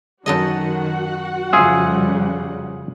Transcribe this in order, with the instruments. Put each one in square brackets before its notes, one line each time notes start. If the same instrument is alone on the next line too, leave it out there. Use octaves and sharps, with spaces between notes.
[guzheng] F#2 A4 D#5 [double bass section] D#3 [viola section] F#4 F#5
[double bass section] F2 C#3 G3 [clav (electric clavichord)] F4 G#4 E5